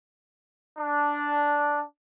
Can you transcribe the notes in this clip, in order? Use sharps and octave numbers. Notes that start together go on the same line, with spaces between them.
D4